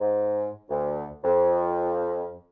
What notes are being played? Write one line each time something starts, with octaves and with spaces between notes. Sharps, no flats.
G#2
D2
F2